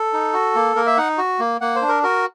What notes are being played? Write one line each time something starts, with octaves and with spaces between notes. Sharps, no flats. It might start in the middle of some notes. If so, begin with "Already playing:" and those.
Already playing: A4
D#4
F#4
A#3
A#3 A#4
E5
D#4 F#5
F#4
A#3
A#3 F#5
C5
D4
A#4
F#4 A#4